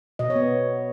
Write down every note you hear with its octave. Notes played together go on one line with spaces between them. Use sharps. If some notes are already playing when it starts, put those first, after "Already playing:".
B2 D#5
C#5
B3